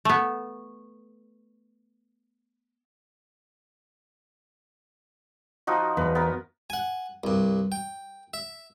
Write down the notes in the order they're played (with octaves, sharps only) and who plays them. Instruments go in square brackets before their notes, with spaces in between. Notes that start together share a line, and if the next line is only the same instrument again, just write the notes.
[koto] A3 B3
[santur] F3 D#4 F#4
[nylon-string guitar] E2 [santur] B4
[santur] B3 A#4
[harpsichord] F#5 G#5
C2 G2
G5
E5